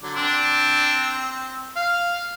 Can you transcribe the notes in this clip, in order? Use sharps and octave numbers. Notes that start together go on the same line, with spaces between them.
D3 F#3 D6
C4 D4
F5